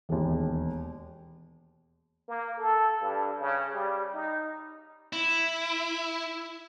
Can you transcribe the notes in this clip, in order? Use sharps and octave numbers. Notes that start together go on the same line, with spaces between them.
E1 D#2
A#3
A4
G2
C#3
G3
D#4
E4